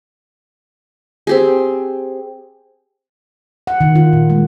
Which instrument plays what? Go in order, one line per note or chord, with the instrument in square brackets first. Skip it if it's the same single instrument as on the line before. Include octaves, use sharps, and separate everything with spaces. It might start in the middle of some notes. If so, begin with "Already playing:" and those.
[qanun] C4 G4 G#4
[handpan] F#5
D#3
F4
A#2
G#3